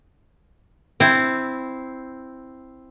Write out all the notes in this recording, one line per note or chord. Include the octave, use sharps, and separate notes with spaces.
C4 E4